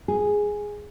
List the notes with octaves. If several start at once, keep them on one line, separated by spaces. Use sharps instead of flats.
G#4